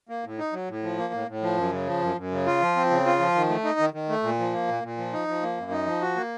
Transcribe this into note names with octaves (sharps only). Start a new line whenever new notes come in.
A#3
A2
D#4
F#3
A2
F3
A#3
A2
A2
F3
F#2
C#3
F3
F#2
F#2
C#3
F4
F3
C4
C#3
F4
F3
D#3
A3
D#4
D#3
D#3
A3
A#2
F3
A#3
A#2
A#2
F3
D#4
F3
A#3
F#2
D#4
F3
F#4
A#3